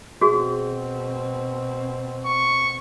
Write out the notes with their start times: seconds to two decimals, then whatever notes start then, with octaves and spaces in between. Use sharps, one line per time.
0.21 B2 C4 F#4 G#4
2.25 C#6